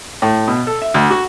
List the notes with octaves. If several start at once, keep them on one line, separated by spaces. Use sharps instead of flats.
A2
B2
A4
E5
D2
F#4